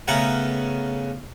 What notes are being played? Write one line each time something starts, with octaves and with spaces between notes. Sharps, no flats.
C#3 A3 B3 A#4 F#5